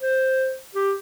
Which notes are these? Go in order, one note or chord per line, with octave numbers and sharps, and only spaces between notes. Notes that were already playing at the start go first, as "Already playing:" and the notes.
C5
G4